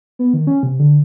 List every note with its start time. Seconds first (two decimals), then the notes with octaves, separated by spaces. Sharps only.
0.19 B3
0.34 D#3
0.47 C#4
0.63 C3
0.79 D3